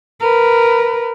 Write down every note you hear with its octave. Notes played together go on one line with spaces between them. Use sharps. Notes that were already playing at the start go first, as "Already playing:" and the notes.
A#4 B4